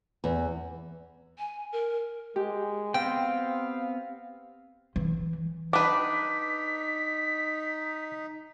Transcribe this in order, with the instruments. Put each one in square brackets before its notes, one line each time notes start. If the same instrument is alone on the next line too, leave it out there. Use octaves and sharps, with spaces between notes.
[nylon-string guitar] E2
[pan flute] G#5
A#4
[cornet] G#3 [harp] G4
[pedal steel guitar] B3 C4 C5 [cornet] F5 [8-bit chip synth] G5
[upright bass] E3
[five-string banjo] D4 B4 [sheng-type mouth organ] D#4 [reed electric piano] D6 [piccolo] B6